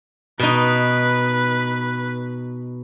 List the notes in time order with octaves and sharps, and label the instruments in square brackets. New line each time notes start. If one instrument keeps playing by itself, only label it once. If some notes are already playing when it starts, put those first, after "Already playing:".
[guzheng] B2 D#4 [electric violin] B4